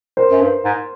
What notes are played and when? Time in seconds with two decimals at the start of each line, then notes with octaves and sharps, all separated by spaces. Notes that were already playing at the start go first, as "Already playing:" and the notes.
0.17 A#4 C5
0.32 F#2
0.41 G2
0.65 G#2